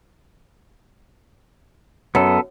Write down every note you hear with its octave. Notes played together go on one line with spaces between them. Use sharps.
F#2 B3 A4